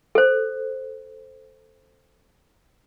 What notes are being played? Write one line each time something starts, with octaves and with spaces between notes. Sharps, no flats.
A4 C5